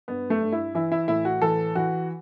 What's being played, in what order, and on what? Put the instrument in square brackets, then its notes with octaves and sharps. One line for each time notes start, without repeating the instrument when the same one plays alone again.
[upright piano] G2 B3
A3
G2
E4
E3 E4
E4
A2 E4
F#4
E3 A4
E3 F#4